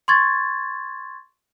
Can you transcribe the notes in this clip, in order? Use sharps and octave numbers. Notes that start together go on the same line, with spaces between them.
C6 C#6 G#6 A6